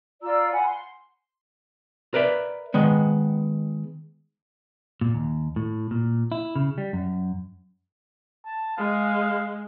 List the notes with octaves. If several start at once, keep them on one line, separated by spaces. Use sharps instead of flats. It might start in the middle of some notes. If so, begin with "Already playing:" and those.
F4 D5 A#5 E6
F#5 G#5 B5
C6
A#4 B4 D5 E5
D#3 G#3 B3
A#2
D#2
A2
A#2
E4
C#3
G3
F#2
A5
G#3 F5